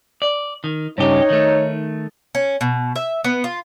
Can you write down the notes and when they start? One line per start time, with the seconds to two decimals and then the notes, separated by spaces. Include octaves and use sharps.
0.22 D5
0.64 D#3
0.98 G2 C#3 D#4 G4 C#5
1.30 D#3 A3
2.35 C#4
2.61 B2
2.96 E5
3.24 B3
3.44 F4